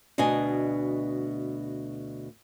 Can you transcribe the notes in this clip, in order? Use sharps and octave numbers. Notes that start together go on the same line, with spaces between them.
D2 B2 D4 D#5 G#5